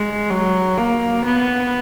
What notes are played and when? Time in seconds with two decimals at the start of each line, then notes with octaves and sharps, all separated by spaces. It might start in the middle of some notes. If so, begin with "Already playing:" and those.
Already playing: G#3
0.30 F#3
0.77 A#3
1.25 B3